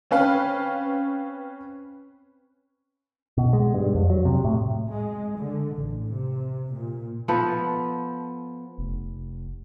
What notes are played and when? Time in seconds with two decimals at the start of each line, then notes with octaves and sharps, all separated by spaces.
0.11 C4 C#4 B4 F5
3.38 B2
3.53 G#3
3.74 G2
3.95 F2
4.10 F#3
4.25 C3
4.45 A2
4.89 G#3
5.39 D3
5.75 A1
6.09 C3
6.71 A#2
7.28 F3 B3 A4
8.78 F1